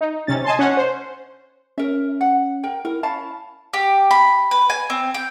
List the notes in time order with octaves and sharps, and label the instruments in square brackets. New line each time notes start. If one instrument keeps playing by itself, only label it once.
[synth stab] D#4
C3 C#4 A6
D#5 G#5 A5 C6
C#4 F#5
C5
[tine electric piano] C#4 [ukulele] A#4 E5
[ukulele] F#5
A#4 G5
[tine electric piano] E4 [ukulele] A#4
[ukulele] C#4 F5 A5 [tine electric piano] B5
[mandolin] G4
B5
B4
G#5
C4
G5